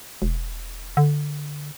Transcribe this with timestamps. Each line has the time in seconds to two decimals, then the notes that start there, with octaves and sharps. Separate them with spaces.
0.22 E1
0.97 D3